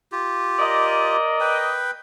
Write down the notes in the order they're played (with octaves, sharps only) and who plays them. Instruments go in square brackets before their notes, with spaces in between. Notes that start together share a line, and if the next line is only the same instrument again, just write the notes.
[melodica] F4 G4
[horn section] A#4 D5 D#5
[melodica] B4 G5